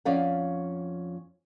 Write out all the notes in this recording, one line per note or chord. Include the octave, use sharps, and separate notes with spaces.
F2 C#4 D5 F5 F#5